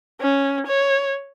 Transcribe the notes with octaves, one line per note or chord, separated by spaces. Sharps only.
C#4
C#5